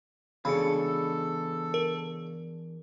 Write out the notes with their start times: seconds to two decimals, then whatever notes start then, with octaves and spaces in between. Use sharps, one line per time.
0.45 E2 C#3 D4 A4 B5 C#7
1.74 A#4